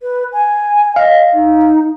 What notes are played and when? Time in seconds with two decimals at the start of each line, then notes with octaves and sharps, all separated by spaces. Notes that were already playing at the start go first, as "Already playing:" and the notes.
0.02 B4
0.32 G#5
0.96 D#5 F5
1.33 D#4